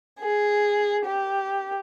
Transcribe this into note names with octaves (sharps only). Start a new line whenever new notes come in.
G#4
G4